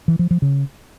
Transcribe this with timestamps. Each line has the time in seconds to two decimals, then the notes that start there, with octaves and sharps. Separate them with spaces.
0.08 E3
0.19 F3
0.31 F3
0.42 C#3